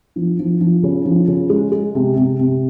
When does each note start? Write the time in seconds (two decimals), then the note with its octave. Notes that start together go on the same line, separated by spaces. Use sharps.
0.16 F3
0.39 F3
0.61 F3
0.83 C#3
1.05 F3
1.28 C#3
1.50 G#3
1.72 G#3
1.95 C3
2.16 C3
2.39 C3